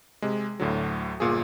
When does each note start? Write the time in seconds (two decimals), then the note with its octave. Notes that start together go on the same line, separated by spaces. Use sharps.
0.22 C3 G#3
0.60 D2 A2 D3 F#3
1.20 G1 A#2 F4 G#4